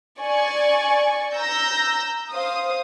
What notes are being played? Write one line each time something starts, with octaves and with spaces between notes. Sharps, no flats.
D5 G#5 C#6
A#5 E6 G6 A#6
C5 F5 D#6